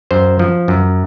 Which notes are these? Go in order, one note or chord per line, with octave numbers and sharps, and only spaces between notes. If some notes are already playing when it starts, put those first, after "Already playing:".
F#2 C5
F3
F#2